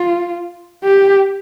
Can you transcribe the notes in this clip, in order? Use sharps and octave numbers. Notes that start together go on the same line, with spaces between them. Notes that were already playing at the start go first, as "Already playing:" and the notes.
Already playing: F4
G4